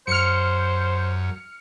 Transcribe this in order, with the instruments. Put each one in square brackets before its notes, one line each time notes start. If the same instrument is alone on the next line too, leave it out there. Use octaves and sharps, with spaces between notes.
[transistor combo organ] F#2 [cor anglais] C5 [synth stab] F6 C#7